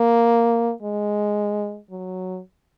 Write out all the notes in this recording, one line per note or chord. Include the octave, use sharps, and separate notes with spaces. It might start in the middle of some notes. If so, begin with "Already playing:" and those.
Already playing: A#3
G#3
F#3